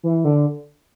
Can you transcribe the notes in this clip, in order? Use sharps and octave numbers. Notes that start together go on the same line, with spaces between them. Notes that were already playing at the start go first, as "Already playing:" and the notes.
E3
D3